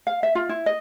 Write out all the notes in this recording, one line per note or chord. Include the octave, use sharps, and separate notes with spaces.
F5
E5
F4
E4
D#5